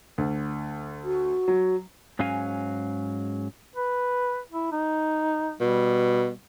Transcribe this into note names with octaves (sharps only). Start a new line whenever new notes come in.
D2
F#4
F#3
G#2 F#3 C#4 F5 G#5
B4
E4
D#4
B2 G3